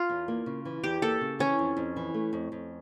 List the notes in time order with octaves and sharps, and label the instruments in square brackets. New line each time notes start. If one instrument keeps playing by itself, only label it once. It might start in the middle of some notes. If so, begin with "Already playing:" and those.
Already playing: [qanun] F4
[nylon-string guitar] E2
A#3
C#3
E3
[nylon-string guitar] E2 [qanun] G4
[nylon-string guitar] A#3 [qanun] A4
[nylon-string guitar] C#3
[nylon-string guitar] E3 [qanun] C#4
[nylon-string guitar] F2
F2
E3
A3
F2
F2